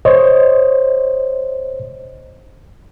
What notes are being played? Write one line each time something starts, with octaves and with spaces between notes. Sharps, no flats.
C5 C#5 D#5